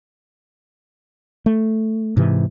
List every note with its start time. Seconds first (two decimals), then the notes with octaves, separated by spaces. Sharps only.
1.46 A3
2.17 G#2 C3 E3